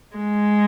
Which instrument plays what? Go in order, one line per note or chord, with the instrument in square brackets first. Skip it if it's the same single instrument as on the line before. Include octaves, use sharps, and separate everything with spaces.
[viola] G#3